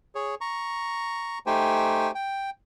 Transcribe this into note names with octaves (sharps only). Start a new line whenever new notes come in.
G#4 C#5
A#5 C#6
A3 D#4 G4 C5 G5 G#5
G5